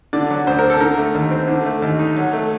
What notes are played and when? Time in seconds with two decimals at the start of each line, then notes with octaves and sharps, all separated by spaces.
0.13 D3 D5
0.30 F#3
0.47 D2 C5
0.59 C4 A#4
0.70 A4
0.80 D3 A#4
0.98 A3
1.14 D#2
1.31 C4
1.48 D3
1.65 A3
1.82 D#2
1.99 D#4
2.16 F#3
2.33 A3